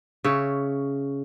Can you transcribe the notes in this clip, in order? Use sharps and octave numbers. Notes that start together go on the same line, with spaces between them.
C#3 C#5 E5